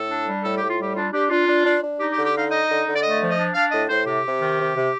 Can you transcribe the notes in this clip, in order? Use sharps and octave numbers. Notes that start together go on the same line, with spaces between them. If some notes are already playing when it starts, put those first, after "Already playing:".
Already playing: A2 A4
D4
G3
A2 A4
A2 G4
F4
G3 G4
D4 F4
D4 G4
D4 F4
D4
D4
D4
D#4 G4
G4
D3
G4
D#4 F5
D#4 D#5
D3
D3
D5
A3 D#5
F3
D#5
D4
D4 F5
A2 D#5
A2 C5
C3 G4
C3
D#3
C3
C3